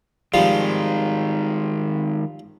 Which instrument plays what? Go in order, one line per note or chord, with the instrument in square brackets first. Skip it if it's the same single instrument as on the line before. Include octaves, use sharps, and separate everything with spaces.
[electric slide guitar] D#3 G#3 [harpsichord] F3 G3 F4